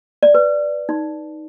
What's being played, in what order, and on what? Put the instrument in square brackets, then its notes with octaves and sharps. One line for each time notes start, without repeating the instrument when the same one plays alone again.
[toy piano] D5
B4
D#4